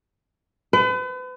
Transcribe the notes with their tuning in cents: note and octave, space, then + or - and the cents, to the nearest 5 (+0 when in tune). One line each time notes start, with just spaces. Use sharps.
B4 +40